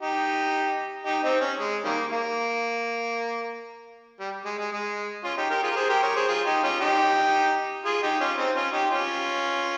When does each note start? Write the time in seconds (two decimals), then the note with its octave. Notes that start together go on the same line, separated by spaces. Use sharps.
0.02 D#4 G4
1.05 D#4 G4
1.23 C4 D#4
1.41 C#4
1.59 G#3
1.84 D#3 G3 A#3
2.11 A#3
4.20 G3
4.45 G#3
4.58 G#3
4.72 G#3
5.23 C#4 F4
5.37 D#4 G4
5.50 G4 A#4
5.63 F4 G#4
5.71 A#4
5.76 G#4 C5
5.89 G4 A#4
6.02 A#4 C#5
6.16 G#4 C5
6.28 F4 G#4
6.46 D#4 G4
6.63 C#4 F4
6.81 D#4 G4
7.85 F4 G#4
8.03 D#4 G4
8.20 C#4 F4
8.38 C4 D#4
8.55 C#4 F4
8.72 D#4 G4
8.90 C#4 F4